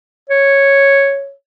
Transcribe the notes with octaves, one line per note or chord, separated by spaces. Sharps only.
C#5